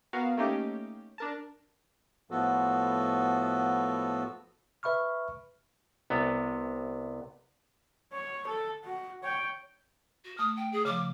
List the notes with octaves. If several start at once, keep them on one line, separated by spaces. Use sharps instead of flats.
B3 F#4 A#4 F5
A3 A#3 C#4 D#4 G4
D4 A#4 A5
A2 F3 B3 F#4 A4
B4 E5 B5 C#6 F6
C2 C3 B3
C#5
A4
F#4
C#5 G5
F#4
A3 D#6 F6
G5
G#4
C#3 F3 D6